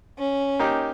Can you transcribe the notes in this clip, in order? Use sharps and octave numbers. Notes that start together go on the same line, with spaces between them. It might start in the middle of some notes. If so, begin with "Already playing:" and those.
C#4
A#3 D#4 G4